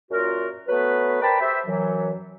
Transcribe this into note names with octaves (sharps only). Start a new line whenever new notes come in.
F#2 A#2 F4 F#4 A#4
F#3 A3 B3 B4
A#4 C5 D5 G5 A5 B5
G4 C5 E5
F#2 E3 F#3